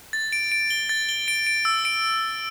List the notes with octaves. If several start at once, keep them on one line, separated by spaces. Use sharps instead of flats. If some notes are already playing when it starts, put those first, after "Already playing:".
A6
D7
D7
G7
A6
G7
D7
D7
E6
D7